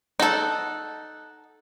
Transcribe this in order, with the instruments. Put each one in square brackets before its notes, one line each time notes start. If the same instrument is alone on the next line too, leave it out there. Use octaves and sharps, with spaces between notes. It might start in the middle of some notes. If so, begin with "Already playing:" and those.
[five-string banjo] D#4 A4 [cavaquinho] F#5 A5